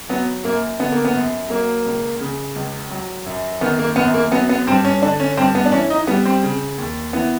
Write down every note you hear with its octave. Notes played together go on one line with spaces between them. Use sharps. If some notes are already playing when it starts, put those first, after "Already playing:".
F#3 B3
F#2 A#3
D3 B3
A#3
B3
F#2
F#3 A#3
C#2
C#3
C#2
F#3
F#2
D#3 B3
A#3
F#2 B3
A#3
F#3 B3
B3
G2 C4
C#4
D3 D4
C#4
G2 C4
B3
D4
E3 C#4
D#4
G3 B3
C4
C#3
D#2
E3 B3